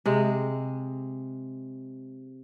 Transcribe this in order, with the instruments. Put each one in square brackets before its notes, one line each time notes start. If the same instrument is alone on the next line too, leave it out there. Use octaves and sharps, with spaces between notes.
[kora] C3 G#3